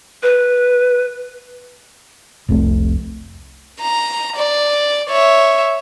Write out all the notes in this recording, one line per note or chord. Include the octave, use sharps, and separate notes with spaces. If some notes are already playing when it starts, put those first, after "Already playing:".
B4
F1 C2 C3 A3
A#5
D5
C#5 E5